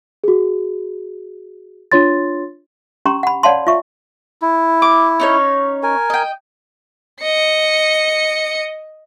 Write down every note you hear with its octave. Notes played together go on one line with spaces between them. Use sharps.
F#4 G#4
D4 F4 C#5 C6 A6
C#4 G4 A#5 C6 C#6
F#5 B5
C#5 D5 F5 F#5 A5 C6
F4 E5 C#6
E4
D6
C#4 D#4 C#5
A#4 G#5
D#5 G5
D#5 C#7